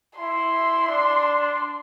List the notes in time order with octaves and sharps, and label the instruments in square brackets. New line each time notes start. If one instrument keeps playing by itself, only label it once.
[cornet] E4 [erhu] C6
[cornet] D4